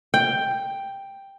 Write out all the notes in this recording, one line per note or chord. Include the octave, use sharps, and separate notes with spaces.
G5